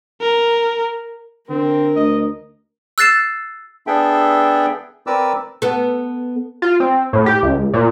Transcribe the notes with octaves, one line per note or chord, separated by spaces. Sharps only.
A#4
D3 C4 A#4
D2 D#5
E6 F#6 A6 C7 E7
B3 D4 G#4 A4 E5 G5
C4 A#4 B4 D5 D6 E6
B3 A4
F4
C4
A2
G4
C#2
A#2